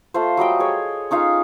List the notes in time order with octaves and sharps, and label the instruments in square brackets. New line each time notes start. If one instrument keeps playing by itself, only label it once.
[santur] A3 F4 C5
F#3 G3 D#5 G5
G#4 C#5
C#4 D#4 F4 F5